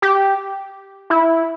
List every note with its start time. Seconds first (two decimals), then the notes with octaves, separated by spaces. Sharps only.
0.02 G4
1.10 E4